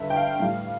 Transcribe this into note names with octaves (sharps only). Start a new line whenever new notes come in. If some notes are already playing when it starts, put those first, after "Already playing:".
Already playing: G2 D3 E5
G5
F5
A2 G3 F5